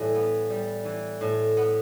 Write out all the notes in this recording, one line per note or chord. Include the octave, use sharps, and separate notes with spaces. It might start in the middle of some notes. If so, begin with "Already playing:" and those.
Already playing: A2 E3 G3
B3
G3
E3
A2
B3